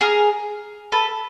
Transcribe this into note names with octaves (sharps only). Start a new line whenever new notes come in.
G#4 A#4
A4 B4